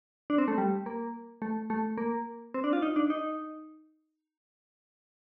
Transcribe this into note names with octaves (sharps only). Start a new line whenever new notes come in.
D4
C4
A3
G3
A#3
A3
A3
A#3
C4
D4
F4
D#4
D4
D#4